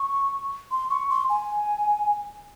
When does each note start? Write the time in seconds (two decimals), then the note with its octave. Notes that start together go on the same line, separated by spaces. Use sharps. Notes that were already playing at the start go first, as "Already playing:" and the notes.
Already playing: C#6
0.71 C6
0.90 C#6
1.10 C6
1.29 G#5